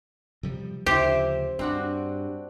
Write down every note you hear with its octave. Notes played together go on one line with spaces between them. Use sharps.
C3 F3 G3
D2 C#3 F3 E4 G4 C5
G2 C4 D4 F#4